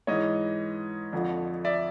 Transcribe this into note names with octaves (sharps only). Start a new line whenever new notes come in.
G#2 E3 C#5 D#5
F2 D3 F3
D5 E5